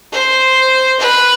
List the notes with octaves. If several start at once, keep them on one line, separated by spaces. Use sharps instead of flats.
C5
B4